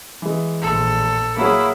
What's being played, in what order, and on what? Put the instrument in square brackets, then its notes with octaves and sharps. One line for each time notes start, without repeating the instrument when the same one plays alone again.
[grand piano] E3 G#3
[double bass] A#1 A#2 [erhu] A4
[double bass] F#3 [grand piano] A#3 F#4 G#4 [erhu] E4